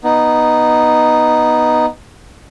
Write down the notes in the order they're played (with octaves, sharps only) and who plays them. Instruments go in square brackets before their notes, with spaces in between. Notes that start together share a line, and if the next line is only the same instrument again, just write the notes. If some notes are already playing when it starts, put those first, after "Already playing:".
[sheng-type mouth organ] B3 D#4